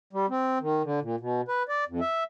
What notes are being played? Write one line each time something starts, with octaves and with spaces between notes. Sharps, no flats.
G3
C4
D#3
D3
A#2
B2
B4
D5
F2
E5